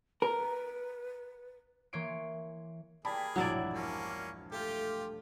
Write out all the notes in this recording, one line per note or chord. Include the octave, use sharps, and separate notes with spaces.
A#4 B4
E3 A#3 C#5 C6 D7
A#3 G4 G#4 D5 A5 B5
E1 A#1 G2 F#3 E4 D5
A#3 C#4
A3 F4 G4